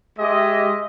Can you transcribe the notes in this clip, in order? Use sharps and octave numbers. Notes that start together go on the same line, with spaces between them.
G#3 G4 D#5 E5